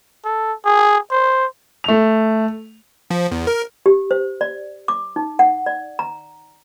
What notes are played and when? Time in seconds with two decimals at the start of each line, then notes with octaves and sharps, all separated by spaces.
0.25 A4
0.65 G#4
1.11 C5
1.84 A3 F7
3.10 F3
3.31 E2
3.47 A#4
3.86 G4
4.11 C5
4.41 D5
4.88 D6
5.16 D#4
5.39 F#5
5.66 D5
5.99 A#5